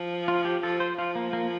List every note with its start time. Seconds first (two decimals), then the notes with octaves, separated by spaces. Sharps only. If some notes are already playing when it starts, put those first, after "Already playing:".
Already playing: F3
0.28 F4
0.45 G4
0.63 F3 A4
0.80 C5
0.98 F3 F4
1.15 A#3
1.33 A#3